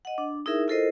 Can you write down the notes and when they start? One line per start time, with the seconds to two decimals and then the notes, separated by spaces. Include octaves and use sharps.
0.05 D#5 F#5
0.18 D4
0.46 D#4 E4 G#4 A#4 E5
0.68 E4 F4 A4 A#4 C5 D#5